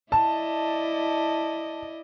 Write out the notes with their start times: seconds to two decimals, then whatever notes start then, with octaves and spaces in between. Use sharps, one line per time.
0.12 E4 D5 D#5 A5